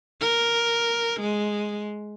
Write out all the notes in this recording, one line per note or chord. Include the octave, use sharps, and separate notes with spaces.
A#4
G#3